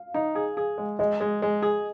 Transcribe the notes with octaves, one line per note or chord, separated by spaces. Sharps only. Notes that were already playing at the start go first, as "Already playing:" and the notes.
Already playing: F5
D#4
G#4
G#4
G#3
G#3 D#5
G#3
G#3
G#4